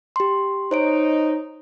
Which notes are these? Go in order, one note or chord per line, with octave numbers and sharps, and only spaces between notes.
G4 C6
D#4 C5 C#5 D7